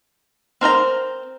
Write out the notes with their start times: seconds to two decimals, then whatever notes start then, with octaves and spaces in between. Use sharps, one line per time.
0.61 C4 A#4 C5 A#5